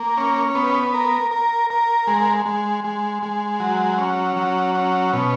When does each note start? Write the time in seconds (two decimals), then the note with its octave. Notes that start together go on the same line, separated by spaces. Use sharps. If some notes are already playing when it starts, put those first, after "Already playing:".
Already playing: A#3
0.17 C#4
0.55 B3
0.94 A#4
1.31 A#4
1.70 A#4
2.07 G#3
2.45 G#3
2.84 G#3
3.23 G#3
3.60 F#3
3.98 C#4
4.36 F#3
4.75 C#4
5.13 B2